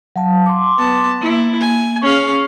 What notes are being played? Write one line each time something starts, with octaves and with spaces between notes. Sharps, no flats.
F#3 F5 A5
C6 D6
B3 A5
A#3 E4
G#5
C#4 G#4 F5 C#6